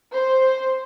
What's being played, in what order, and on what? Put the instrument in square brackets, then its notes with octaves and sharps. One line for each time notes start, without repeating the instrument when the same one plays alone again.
[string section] C5